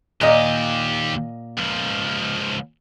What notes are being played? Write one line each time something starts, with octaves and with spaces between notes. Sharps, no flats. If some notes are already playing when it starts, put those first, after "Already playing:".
D#2 A#2 G4 D#5
C#2 F3